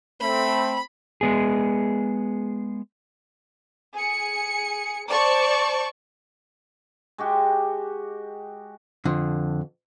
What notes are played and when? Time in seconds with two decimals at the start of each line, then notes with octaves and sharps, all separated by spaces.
0.21 A3 C4 B5
1.21 G#3 B3 G#4
3.94 G#4 C#7
5.09 C5 D5 A5 C#6
7.18 G#3 F#4 G4
9.05 F2 D3